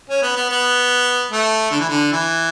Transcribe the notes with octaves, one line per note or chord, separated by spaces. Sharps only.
C#4
B3
B3
B3
A3
D3
E3
D3
E3